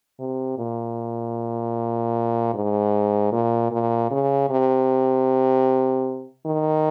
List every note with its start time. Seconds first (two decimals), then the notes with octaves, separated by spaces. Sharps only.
0.20 C3
0.58 A#2
2.54 G#2
3.32 A#2
3.71 A#2
4.11 C#3
4.50 C3
6.46 D#3